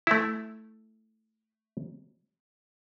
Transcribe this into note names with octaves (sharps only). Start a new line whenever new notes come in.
A3 E4